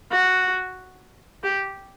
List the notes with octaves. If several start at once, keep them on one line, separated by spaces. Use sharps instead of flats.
F#4
G4